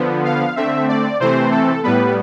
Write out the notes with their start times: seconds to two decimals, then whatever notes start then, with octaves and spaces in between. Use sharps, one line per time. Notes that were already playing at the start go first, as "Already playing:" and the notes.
Already playing: D3 F3 B3
0.25 F5
0.56 D3 A3 C4 E5
0.89 D5
1.20 C3 E3 A3 C4 C5
1.52 A4
1.84 A2 G3 B3 B4